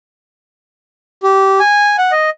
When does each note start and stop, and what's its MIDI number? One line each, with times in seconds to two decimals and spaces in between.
1.23 1.59 67
1.60 1.97 80
1.98 2.12 78
2.12 2.30 75